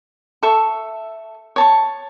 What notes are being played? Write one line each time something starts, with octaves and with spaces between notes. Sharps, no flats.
A4 E5 C#6
C#5 A5 C#6